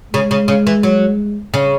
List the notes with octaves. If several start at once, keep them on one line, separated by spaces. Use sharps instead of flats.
C#3 G#3
C#3
C#3
E3
F#3
C#3